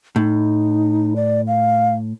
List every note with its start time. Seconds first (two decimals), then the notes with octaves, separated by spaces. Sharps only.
0.16 A2 D#4
1.16 D5
1.47 F5